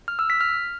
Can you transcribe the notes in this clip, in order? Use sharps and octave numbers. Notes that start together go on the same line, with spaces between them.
F6
E6
B6
F6